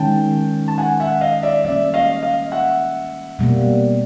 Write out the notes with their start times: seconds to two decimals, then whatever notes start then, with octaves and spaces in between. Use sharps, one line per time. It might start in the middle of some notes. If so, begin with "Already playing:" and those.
Already playing: D#3 G#3 C#4 G5 A5
0.68 A5
0.78 F#5 G#5
1.00 E5 F#5
1.21 D#5 F5
1.43 D5 E5
1.65 G3 A#3 C#4 D5 E5
1.94 D#5 F5
2.23 D#5 F5
2.52 E5 F#5
3.39 B2 G3 A#3